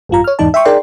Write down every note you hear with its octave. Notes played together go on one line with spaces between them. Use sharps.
G#1 F#2 F4 A#5
C#5 F6
E2 G#2 E3 D#4 D5 A5
E5 G5 C6 C#6
D#4 G#4 A#4 D5 G5 C6